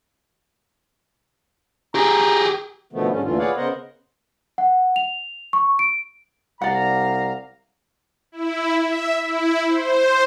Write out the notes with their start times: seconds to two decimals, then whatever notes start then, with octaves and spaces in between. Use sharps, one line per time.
1.95 G4 G#4 A#5
2.93 B2 D3 D#3 F3 A3 B3
3.11 G#2 D3 G3 C#4
3.24 D2 A#2 D3 E3 F4
3.39 G#4 B4 C#5 D5 F5 F#5
3.57 C#3 B3 A#4 C5 D#5 F#5
4.58 F#5
4.96 F7
5.53 C#6
5.79 D7
6.62 C2 D5 F5 F#5 A#5
8.32 E4
8.74 E5
9.22 E4
9.68 C5